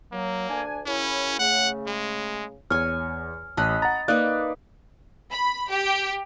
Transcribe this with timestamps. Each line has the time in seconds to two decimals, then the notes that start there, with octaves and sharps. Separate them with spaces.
0.12 F#3 A#3
0.49 D2 D4 G#5
0.86 F#2 C#3 C#4 E4
1.39 C#3 A3 F#5
1.87 G#3
2.70 E2 C#5 G#5 F6
3.57 A1 D#5 A5 B5 F#6
3.82 F#5 A#5 A6
4.08 A#3 D#4 B4 D5 F#6
5.32 B5
5.71 G4